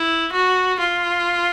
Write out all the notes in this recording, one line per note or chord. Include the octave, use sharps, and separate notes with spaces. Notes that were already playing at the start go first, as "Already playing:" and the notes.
Already playing: E4
F#4
F4